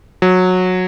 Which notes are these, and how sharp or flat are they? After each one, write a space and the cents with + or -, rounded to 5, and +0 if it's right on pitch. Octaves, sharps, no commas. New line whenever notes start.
F#3 -15